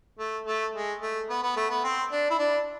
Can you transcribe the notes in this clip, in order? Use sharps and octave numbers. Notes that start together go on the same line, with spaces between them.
A3
A3
G#3
A3
B3
B3
A3
B3
C4
D4
E4
D4